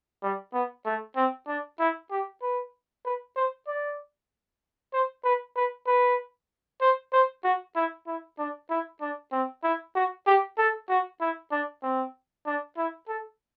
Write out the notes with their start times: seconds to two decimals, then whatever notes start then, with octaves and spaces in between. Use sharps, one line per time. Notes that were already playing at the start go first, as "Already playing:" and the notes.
0.23 G3
0.53 B3
0.85 A3
1.16 C4
1.47 D4
1.79 E4
2.10 G4
2.42 B4
3.05 B4
3.36 C5
3.67 D5
4.93 C5
5.24 B4
5.56 B4
5.87 B4
6.81 C5
7.13 C5
7.44 F#4
7.75 E4
8.07 E4
8.38 D4
8.70 E4
9.01 D4
9.32 C4
9.63 E4
9.95 F#4
10.27 G4
10.58 A4
10.89 F#4
11.20 E4
11.52 D4
11.83 C4
12.46 D4
12.77 E4
13.08 A4